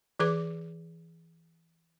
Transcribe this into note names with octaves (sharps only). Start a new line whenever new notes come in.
E3 G#4 B4 D6